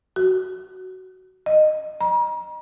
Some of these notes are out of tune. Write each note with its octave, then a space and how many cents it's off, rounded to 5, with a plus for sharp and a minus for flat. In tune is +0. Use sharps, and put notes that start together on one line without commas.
F#4 +15
D#5 -15
A#5 +40